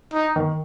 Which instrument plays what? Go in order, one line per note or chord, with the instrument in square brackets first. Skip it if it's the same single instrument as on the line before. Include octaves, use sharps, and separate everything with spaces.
[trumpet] D#4
[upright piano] D#3